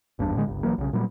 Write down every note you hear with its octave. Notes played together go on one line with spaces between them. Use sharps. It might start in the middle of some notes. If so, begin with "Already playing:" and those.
G#1 E2 G2 D4
A2 D3 G#3
G1 C#2
A#1 E3 F#3 A#3
B1 C#3
A#2 F#3 G3